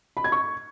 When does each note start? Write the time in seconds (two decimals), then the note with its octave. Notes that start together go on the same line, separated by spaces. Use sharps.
0.17 B5
0.24 G#6
0.32 C#6